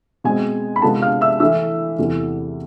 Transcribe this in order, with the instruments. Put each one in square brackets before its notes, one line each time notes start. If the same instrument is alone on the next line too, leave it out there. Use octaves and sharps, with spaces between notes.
[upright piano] B2 G#3 C4 G#4 G#5
B5
C3 G#3 B3 F4 A4 A5
F5 F6
E5 E6
E3 A3 E4 E5 E6
E2 C3 E3 A3